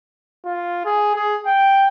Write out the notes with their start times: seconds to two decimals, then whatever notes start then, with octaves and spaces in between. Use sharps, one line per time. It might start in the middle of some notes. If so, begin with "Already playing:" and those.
0.45 F4
0.85 G#4
1.15 G#4
1.47 G5